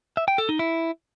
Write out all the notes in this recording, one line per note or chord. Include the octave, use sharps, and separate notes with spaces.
E5
G5
A4
D#4
E4